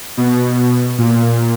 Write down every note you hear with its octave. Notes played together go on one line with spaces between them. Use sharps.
B2
A#2